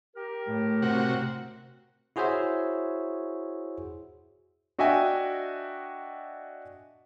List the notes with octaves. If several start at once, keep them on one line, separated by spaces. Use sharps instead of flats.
G4 A#4
A2
C3 F#4
E4 F#4 G#4 C5 C#5 E5
D4 F#4 D#5 E5 G5 G#5